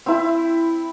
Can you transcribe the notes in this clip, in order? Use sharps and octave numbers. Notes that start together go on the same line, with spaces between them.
C4 E4